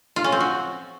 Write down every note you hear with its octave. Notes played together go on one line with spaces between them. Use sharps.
F4
C#4
C4
F#4